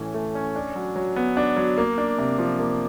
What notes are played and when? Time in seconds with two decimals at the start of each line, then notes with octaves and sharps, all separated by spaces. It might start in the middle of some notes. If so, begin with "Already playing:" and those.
Already playing: A2 E3 A3 C#4
0.14 A3
0.35 C#4
0.56 D4
0.76 F#3
0.96 F#3
1.16 B3
1.37 D4
1.57 F#3
1.78 A#3
1.98 D4
2.18 C3
2.39 F3
2.59 A#3